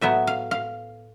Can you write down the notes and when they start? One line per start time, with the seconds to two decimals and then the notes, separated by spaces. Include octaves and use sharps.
0.01 A2 F#3 B3 E5
0.27 F5
0.51 F5